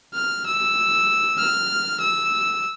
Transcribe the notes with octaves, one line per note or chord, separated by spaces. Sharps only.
F6
E6
F6
E6